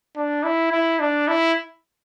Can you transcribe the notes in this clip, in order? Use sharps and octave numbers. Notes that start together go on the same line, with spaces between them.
D4
E4
E4
D4
E4